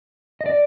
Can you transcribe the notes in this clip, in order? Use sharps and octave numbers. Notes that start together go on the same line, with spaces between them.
D#5
D5